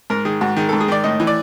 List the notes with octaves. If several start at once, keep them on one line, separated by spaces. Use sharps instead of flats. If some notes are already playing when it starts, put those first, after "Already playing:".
G#2 A#4
D#3 G#4
G#2 F#4
D#3 G#4
A4
G#2
G#4
D#3 D5
A2 D#5
E3
D5